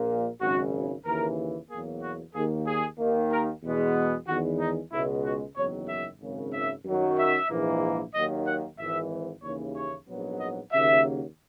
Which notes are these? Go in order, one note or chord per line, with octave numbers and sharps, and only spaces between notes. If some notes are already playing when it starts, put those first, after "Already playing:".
Already playing: A#1 A#2 A#3
G#1 F#2 C#3 F#4
D#2 C#3 E3 A#4
E2 B2 F#3 A#3 G#4
F#4
D#2 D#3 A#3 G#4
G#4
D#2 D#3 A#3
A#4
E2 B2 G#3 B3
E2 D#3 G#3 B3 F#4
D#4
C#2 B2 G#3 E4
F#4
F#1 E2 D#3 F#3 C#5
E5
G#1 F#2 C#3
E5
F#2 D#3 F#3
E5
A#1 G#2 E3 A#3
D#2 D#3 F#3 A#3 D#5
F#5
G#1 G#2 E3 E5
D#2 C#3 E3 C#5
C#5
A#1 G#2 F#3 B3
D#5
D#2 C#3 F#3 A#3 E5